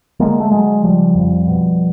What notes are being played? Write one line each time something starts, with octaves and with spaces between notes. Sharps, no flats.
D3 G#3 A#3
A3
D3 F#3 G#3
C#3 F3 G3
F2
B2